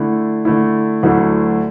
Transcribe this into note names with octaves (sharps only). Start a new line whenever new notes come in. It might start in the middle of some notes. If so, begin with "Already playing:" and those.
Already playing: D3 A3 E4
D3 A3 E4
D2 D3 F#3 A3 E4